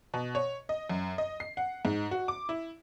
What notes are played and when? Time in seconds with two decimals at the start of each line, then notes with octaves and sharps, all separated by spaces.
0.14 B2
0.35 C#5
0.69 D#5
0.90 F#2
1.18 D#5
1.40 C7
1.57 F#5
1.85 G#2
2.11 F#4
2.28 D6
2.49 E4